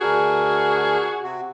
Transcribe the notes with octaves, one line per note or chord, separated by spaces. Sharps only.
D2 D4 F#4 G#4 A#4
C3 F#4